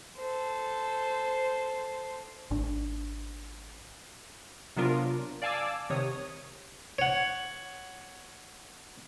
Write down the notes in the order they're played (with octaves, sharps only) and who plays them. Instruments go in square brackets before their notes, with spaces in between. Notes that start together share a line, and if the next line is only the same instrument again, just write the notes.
[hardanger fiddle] A4 C5
[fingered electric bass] G#1 D4
[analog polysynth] C3 F#3 B3 D4 F4 A#4
D5 F5 G#5 A5 D6 E6
C3 D#3 C#5 D#6
[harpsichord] C#5 F#5